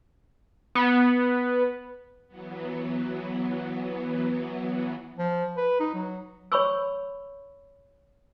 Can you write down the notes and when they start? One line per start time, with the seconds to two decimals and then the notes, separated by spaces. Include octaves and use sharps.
0.75 B3
2.27 E3 F#3 B3
5.19 F3
5.57 B4
5.80 D#4
5.94 F#3
6.52 C#5 B5 C#6 E6